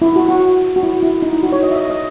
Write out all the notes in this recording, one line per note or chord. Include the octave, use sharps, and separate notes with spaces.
E4
F#4
F#4
F#4
E4
E4
D#4
E4
F#4
C#5
D#5
E5
D#5
D#5